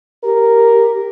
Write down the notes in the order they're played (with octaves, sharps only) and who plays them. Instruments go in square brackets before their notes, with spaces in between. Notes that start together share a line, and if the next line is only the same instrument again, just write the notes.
[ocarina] G4 [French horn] A#4